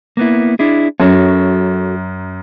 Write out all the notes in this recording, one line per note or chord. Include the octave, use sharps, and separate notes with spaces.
A#3 B3 E4
D4 E4 G#4
F#2 F#4 A4 C#5